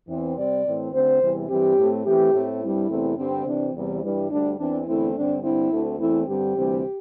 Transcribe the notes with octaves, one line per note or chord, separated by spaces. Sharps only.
E2 E3 C4
C3 G3 C4 D5
A2 E3 C4
D2 D3 C4 C5
E2 C3 E3 G3
G2 E3 G3 C4 G4
A2 A3 C4
E2 E3 A3 C4 G4
A2 A3 C4
G2 G3 C4 E4
E2 C3 A3 C4
G2 D3 G3 C4
C3 E3 C4 D4
E2 C3 E3 G3 C4
G2 E3 G3
D2 D3 G3 D4
E2 E3 C4 D4
E2 D3 A3 C4 E4
G2 D3 C4 D4
G2 D3 C4 E4
D2 D3 A3 C4
E2 E3 A3 C4 E4
G2 D3 G3 C4 G4
D2 C3 E3 G3 C4